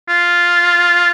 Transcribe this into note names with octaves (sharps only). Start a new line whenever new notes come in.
F4